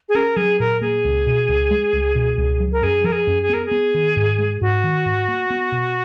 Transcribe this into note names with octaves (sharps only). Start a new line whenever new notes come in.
G#4
C#4 A#4
F#3 G#4
A#2 A#4
A#3 G#4
C#2
B2
C#2
G#3
C#2
B2
C#2
F#3
A#4
F#2 G#4
F3 A#4
G#4
F#2
G#4
B3 A#4
G#4
B3
D#3
G#2
G#3
G#2 F#4
D#3
G#2
A#3
B3
B2